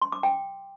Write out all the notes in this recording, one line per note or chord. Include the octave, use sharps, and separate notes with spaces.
C6
D6
G5